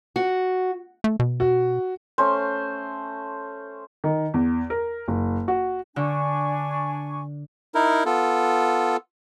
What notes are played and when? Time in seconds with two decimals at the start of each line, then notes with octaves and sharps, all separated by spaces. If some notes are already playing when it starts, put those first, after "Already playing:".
0.16 F#4
1.04 A3
1.19 B2
1.40 F#4
2.18 A3 C#4 C5
4.04 D#3
4.34 E2
4.70 A#4
5.08 F#1
5.48 F#4
5.96 D3 D4 G#5 C#6
7.75 D#4 E4 A#4
8.06 B3 F4 A4